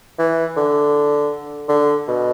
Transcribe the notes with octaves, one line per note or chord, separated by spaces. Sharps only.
E3
D3
D3
B2